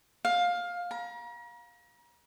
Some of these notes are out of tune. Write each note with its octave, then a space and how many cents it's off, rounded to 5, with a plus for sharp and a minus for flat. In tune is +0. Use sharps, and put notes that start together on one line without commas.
F5 +15
A#5 +40